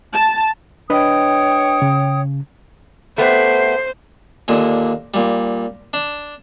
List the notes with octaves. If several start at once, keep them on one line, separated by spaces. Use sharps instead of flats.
A5
D4 B4 C#5 D#5 G5 D#6
C#3
A3 B3 G4 C5
D#2 A#2 D3
A#2 G3
D4